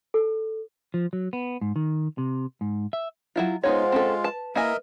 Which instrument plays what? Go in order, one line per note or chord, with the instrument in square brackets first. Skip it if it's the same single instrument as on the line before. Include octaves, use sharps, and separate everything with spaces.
[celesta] A4
[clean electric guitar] F3
F#3
B3
G#2
D#3
C3
G#2
E5
[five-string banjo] F#3 E4 F4
[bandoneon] G#3 F4 [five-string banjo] B3 D#4 C#5 [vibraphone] C5 F#5
[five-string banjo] C4 C#4 A4
[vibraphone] B4 [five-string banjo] A5
[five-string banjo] A#3 E4 G#5 [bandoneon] A#4 D#5 E5